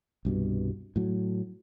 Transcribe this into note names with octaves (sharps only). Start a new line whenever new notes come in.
C2 G2 B2
A2 F#3